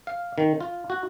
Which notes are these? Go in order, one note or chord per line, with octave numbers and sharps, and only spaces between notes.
F5
D#3
F4
F#4